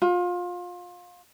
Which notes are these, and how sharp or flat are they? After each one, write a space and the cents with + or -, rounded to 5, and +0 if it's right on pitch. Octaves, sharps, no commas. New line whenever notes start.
F4 +25